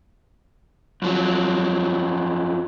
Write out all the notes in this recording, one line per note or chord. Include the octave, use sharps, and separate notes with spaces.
F#2 F3 F#3